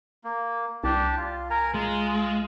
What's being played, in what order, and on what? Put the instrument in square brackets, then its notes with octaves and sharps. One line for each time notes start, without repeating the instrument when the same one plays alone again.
[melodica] A#3
[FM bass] C2 [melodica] D4 G4 A5
[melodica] F4
A#4 G#5 A#5
[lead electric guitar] G#3 [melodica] F4